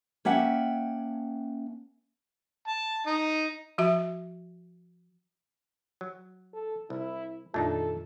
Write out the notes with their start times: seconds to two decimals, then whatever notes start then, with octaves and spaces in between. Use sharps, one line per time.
0.25 A#3 C#4 E5 F#5 G5 A5
2.68 A5
3.07 D#4
3.78 F3 F#4 E5
6.01 F#3
6.54 A4
6.90 C2 E4
7.54 F2 A#2 D#3 A3 D4 D#4 A4